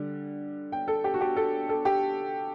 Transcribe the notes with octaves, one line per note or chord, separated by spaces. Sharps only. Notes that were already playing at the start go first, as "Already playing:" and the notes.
Already playing: D3 G3
G5
A4
G4
F#4
G4
A4
A4
G4